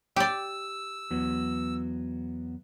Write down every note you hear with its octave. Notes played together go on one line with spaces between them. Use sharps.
G4 D5 E6
E2 F#3 B3